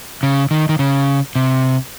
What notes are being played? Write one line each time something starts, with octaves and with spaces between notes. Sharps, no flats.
C#3
D#3
D#3
C#3
C3